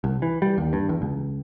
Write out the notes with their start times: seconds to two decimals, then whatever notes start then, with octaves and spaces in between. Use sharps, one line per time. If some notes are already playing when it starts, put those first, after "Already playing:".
0.04 C2
0.22 E3
0.42 G3
0.58 D#2
0.73 G2
0.89 E2
1.02 C#2